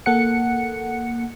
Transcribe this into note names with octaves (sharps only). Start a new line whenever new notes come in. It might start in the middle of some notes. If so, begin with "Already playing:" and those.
A#3 A4 F#5 C#7